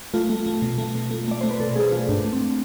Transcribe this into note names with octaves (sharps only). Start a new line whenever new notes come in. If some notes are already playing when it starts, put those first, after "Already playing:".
A3 F4
A3
A3
B2
A3
B2
A3
A3 D5
A3 C5
B4
B2 A4
A3 G#4
A3 F4
G#2 D4
A3
C4